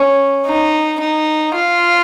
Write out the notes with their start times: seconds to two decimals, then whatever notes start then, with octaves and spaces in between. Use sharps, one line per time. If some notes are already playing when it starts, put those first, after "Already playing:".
Already playing: C#4
0.46 D#4
1.01 D#4
1.55 F4